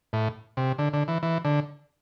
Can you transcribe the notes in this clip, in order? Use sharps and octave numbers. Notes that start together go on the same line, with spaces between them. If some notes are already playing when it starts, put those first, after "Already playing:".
A2
C3
D3
D3
E3
E3
D3